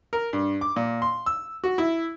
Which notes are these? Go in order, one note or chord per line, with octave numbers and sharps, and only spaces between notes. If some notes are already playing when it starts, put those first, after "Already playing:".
A#4
G2
D6
A#2
C6
E6
F#4
E4